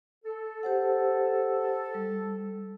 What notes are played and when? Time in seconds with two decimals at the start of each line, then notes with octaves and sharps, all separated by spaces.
0.24 A4
0.63 G4 C5 F#5
1.94 G3